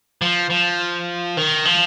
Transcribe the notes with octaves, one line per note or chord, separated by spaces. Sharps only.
F3
F3
D#3
F3